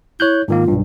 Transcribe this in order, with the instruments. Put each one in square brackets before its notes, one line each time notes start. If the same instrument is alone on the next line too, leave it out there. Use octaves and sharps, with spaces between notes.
[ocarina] E4 [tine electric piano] C#5 F#6 G6
[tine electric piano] G#2 D#3 A#3 [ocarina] F4
[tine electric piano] B1 G2